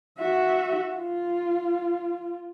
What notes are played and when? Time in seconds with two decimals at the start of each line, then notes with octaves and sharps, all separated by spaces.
0.19 F#4 E5
0.96 F4